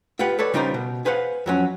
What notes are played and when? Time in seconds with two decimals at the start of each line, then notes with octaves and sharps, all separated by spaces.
0.19 F4 G4 B4 F#5
0.39 A4 B4 C#5 D5
0.54 C#3 G3 D#4 F4 A#4 C5
0.74 B2
1.05 G#4 B4 C5 F5 F#5
1.46 F2 F#3 C#4